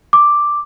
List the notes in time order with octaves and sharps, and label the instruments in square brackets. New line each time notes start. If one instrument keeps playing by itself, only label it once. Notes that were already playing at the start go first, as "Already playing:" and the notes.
[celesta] D6